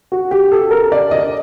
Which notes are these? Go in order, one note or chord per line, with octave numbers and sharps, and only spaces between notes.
F#4
G4
A4
A#4
D5
D#5